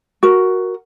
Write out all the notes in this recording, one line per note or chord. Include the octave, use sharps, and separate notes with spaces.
F#4 A#4